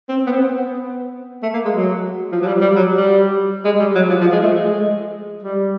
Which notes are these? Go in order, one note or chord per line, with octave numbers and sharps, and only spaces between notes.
C4
B3
C4
B3
A3
A#3
G#3
F#3
F3
F#3
G3
G3
F#3
G3
G#3
G3
F#3
F3
F3
G#3
A3
G#3
G3